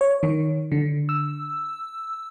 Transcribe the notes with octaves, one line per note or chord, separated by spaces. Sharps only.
C#5
D#3
D3
E6